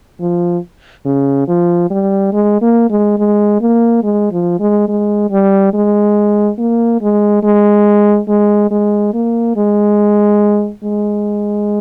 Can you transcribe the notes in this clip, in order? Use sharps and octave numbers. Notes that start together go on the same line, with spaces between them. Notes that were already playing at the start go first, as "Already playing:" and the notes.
F3
C#3
F3
G3
G#3
A#3
G#3
G#3
A#3
G#3
F3
G#3
G#3
G3
G#3
A#3
G#3
G#3
G#3
G#3
A#3
G#3
G#3